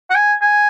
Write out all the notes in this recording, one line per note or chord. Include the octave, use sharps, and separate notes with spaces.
F#5
G#5
G#5